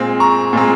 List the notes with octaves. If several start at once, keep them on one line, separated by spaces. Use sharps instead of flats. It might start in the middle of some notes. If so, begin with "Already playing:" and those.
Already playing: A#2 G#3 C4
A#5 C#6
A#2 G#3 C4